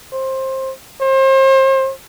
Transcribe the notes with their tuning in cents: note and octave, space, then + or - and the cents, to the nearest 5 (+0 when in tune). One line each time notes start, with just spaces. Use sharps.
C5 +20
C5 +35